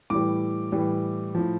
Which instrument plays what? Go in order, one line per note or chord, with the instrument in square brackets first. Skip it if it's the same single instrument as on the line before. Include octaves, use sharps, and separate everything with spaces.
[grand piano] A2 E3 G3 D6
A2 E3 G3
A2 F3